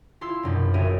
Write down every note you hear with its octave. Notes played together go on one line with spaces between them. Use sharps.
E4 F4 C6 E6 C7
A#1 F#2 B2
F#1 C#5 E5 F6 D7 D#7